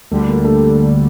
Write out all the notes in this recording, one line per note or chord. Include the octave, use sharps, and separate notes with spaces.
D2 D3 G3 A3
A#3
A3